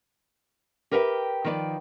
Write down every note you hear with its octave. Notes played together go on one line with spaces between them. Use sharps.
G4 A#4 B4 E5 F5 G5
D#3 F3 B4 C#5 D5